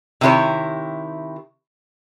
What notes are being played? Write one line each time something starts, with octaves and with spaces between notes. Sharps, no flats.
C3 D#3 E4 G4 C#5